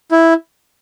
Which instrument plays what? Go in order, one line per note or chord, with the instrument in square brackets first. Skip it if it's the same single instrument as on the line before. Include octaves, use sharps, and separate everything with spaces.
[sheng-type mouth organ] E4